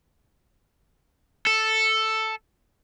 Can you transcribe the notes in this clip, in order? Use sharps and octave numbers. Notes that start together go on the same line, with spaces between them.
A4